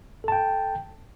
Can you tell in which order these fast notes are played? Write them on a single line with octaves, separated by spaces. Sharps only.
A4 A5 G5